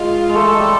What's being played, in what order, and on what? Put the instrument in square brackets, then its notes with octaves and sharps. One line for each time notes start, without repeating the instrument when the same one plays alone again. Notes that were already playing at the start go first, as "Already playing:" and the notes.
Already playing: [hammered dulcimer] G#3 [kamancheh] F4
[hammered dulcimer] G#3
[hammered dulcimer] A3 [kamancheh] A4
[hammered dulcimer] G#3
G3